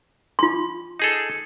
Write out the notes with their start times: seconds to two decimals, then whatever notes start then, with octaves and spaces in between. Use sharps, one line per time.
0.39 F4 C6
0.99 D#4 G#4 A4